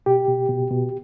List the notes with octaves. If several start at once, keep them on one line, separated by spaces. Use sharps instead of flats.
B2 G4
B2
B2
B2